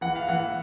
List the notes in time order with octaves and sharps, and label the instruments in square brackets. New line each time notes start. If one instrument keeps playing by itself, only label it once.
[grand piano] E3 F#5
F5
E3 F#5